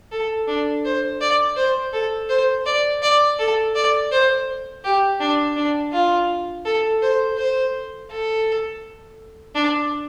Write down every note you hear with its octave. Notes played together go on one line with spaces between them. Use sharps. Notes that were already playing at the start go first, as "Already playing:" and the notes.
A4
D4
C5
D5
C5
A4
C5
D5
D5
A4
D5
C5
G4
D4
D4
F4
A4
C5
C5
A4
D4